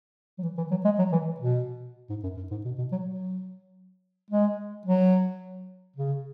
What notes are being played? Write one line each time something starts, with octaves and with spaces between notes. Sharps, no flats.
F#3
E3
E3
F#3
G#3
F#3
E3
B2
G#2
F#2
F#2
G#2
B2
B2
F#3
F#3
G#3
F#3
C#3